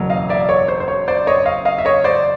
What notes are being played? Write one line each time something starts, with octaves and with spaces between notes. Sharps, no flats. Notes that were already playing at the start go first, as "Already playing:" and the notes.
Already playing: F#1 E2 B2 F#3
D#5 F5
D5 E5
C#5
C5
C5
C#5
C5 D5
C#5 D#5
D#5 F5
D#5 F5
E5
C#5 D#5
C5 D5